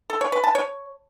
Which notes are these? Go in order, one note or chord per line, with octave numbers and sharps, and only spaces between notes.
A4
C#5
B4
A5
C#5